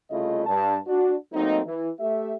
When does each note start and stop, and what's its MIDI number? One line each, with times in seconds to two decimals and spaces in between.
0.10 0.43 36
0.10 0.43 49
0.10 0.43 57
0.10 0.43 64
0.10 0.43 65
0.10 0.43 75
0.46 0.78 43
0.46 0.78 81
0.87 1.15 62
0.87 1.15 66
1.33 1.60 54
1.33 1.60 57
1.33 1.60 58
1.33 1.60 60
1.33 1.60 63
1.66 1.89 52
2.00 2.35 57
2.00 2.35 67
2.00 2.35 76